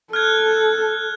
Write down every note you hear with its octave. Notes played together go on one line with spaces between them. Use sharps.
A4 F6 F#6 G#6